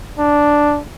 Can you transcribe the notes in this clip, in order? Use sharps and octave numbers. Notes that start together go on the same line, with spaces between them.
D4